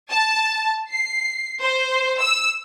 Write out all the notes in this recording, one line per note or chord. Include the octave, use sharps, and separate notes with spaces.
A5
C7
C5
E6